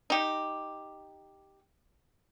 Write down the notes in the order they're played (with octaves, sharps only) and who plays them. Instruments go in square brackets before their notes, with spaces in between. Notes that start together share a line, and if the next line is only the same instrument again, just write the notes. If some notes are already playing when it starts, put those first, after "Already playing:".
[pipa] D#4 G4